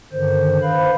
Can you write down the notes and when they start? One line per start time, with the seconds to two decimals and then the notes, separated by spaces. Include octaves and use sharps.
0.13 G2 D3 D#3 C5
0.62 B4 C5 F5 B5